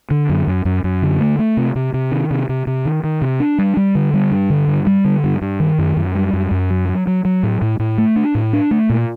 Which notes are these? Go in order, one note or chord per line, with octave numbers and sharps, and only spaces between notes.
D3
F#2
F#2
F#2
F#2
D3
A3
A3
C3
C3
C3
D#3
C3
C3
C3
D#3
D#3
C3
D4
G3
G3
D3
G3
G2
D3
G2
G3
D3
G2
G2
D#3
F#2
F#2
G3
F#2
F#2
F#3
F#3
F#3
F#3
A2
A2
A2
A3
D4
A2
D4
A3
A#2